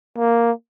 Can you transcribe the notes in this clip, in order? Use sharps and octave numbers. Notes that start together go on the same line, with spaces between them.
A#3